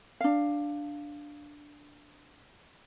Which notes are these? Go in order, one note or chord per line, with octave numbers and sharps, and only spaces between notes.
D4 F5